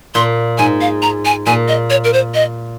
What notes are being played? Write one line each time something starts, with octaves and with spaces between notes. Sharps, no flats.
A#2 C6
G#2 G#5
F5
A#5
G#5
A#2 G#5
D#5
C#5
A#4
C5
D#5